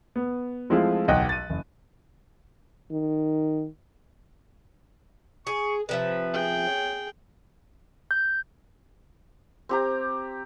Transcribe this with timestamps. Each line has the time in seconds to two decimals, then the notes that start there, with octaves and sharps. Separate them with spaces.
0.16 B3
0.70 F3 G#3 A3 C4 E4 F4
1.08 D1 B1 D#5 F#5 G5 F#6
1.29 A6 D#7
1.50 F#1
2.92 D#3
5.47 G#4 C#6
5.89 C3 F3 B4 E5
6.33 G#4 G5
6.66 C#5
8.11 G6
9.69 C4 G4 A#5